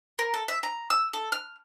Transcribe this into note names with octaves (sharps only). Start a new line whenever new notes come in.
A#4
A4
E5
A#5
E6
A4
F6